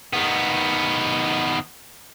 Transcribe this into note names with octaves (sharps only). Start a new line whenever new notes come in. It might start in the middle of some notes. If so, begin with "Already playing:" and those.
D#3 B3